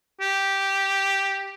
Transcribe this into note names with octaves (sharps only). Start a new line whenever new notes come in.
G4